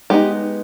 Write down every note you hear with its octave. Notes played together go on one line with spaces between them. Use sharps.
G#3 B3 D#4 G4